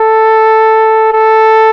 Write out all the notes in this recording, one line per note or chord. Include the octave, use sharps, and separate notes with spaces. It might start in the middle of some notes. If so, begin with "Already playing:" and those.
Already playing: A4
A4